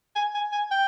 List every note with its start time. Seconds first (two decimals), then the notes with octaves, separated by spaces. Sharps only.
0.16 G#5
0.35 G#5
0.52 G#5
0.71 G5